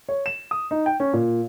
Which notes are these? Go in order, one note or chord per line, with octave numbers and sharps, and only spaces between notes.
C#5
E7
D#6
D#4
G5
C#4
A#2